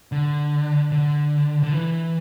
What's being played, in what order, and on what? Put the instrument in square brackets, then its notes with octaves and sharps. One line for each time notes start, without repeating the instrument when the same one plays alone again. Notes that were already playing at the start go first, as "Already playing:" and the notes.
[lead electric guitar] D3
D3
D3
E3